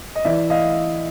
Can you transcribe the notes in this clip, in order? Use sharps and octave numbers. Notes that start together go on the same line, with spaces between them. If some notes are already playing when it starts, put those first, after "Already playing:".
D#5
E3 D5 E5
D#5 F5